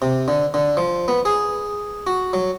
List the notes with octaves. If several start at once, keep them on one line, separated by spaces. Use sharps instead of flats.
C3
D3
D3
F3
B3
G#4
F#4
F#3